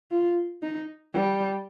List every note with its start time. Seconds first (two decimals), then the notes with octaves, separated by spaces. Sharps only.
0.11 F4
0.62 D#4
1.14 G3